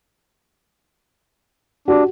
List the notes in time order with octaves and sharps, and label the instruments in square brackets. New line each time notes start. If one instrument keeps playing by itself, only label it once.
[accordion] D4 [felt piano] F#4 G4